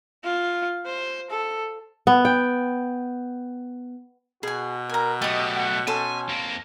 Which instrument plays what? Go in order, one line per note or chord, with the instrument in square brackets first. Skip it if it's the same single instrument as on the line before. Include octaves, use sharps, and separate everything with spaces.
[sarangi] F4
C5
A4
[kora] B3
G5
[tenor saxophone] B2 [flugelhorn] F#4 [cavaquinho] G#4 G#5
[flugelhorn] A#4 [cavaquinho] G#5 A#5
[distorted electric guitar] F#3 A3 [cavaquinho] G4 D#6 [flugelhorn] D#5
[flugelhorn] F#5
[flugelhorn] C#4 [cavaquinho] A4 A5 C6 [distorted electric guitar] G#5
[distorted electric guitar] F2 A#3